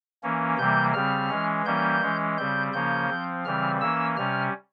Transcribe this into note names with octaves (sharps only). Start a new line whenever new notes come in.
E3 A#3 C#4
C3 E3 G3 A#3 G6
C#3 G3 C4 F6
E3 G#3 C#4
E3 G3 A#3 C#4 G6
E3 G#3 C#4
C#3 G3 C4 G6
C#3 F3 A#3 C#4 G6
F3 C4
C#3 E3 G3 C4 F6
E3 A#3 C#4 E6
C3 G3 C#4 F6